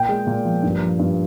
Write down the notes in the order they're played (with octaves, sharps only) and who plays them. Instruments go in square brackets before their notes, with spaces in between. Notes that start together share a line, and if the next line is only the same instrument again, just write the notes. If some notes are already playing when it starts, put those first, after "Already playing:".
Already playing: [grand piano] A#2 G5
G#3
A#2
F3
G2
F3
G2